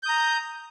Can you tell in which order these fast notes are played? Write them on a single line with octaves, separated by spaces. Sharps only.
G6 D#6 A#5